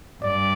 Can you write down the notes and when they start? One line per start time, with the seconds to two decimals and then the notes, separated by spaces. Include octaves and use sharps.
0.23 G2 D5